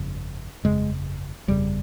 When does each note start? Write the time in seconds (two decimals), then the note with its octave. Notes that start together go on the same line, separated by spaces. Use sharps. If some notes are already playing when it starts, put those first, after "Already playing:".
Already playing: G1 F2 C#3
0.63 G1 F2 C#3 G#3
1.48 G1 F2 C#3 G3